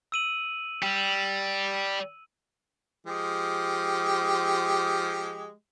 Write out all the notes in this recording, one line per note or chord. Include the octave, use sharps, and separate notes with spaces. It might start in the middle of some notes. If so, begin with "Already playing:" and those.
E6 D#7 F#7
G3
F3 G#3 G4